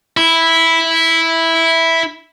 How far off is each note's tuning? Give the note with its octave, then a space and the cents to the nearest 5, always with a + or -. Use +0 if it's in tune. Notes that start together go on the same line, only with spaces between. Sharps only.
E4 -5